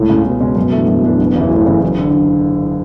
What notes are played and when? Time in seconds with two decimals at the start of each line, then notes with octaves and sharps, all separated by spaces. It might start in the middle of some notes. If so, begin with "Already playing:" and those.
Already playing: C#2 A2
0.10 C#3 G#3 C#4
0.25 C#2 B2
0.40 C#3 G#3 C#4
0.56 F#2
0.72 E3 A3 D4
0.88 F#2
1.04 E3 A3 D4
1.19 F#1
1.36 E2 C#3 E3
1.50 F#1 A2
1.66 E2 C#3 E3
1.82 F#1 F#2
1.99 D3